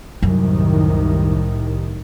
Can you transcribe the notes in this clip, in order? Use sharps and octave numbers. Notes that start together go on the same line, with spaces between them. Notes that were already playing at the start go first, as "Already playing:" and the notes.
C2 F#2 A2 D#3